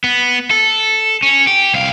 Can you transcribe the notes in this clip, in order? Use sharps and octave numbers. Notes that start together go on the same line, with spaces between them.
B3
A4
C#4
G4
C2 F5